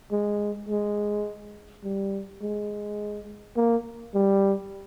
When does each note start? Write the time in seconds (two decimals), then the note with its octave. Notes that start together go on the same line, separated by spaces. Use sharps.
0.12 G#3
0.68 G#3
1.84 G3
2.42 G#3
3.57 A#3
4.15 G3